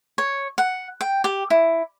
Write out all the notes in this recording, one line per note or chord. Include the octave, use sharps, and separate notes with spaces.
C#5
F#5
G5
G4
E4